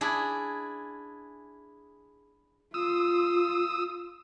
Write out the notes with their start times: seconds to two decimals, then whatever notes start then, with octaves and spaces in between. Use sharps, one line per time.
0.01 D4 E4 G#4
2.74 F4 D#6 E6